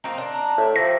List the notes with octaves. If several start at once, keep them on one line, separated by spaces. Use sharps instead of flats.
A#3 C4 D#4
D4
A#5
A2 E5
F3 E4 G4 A#6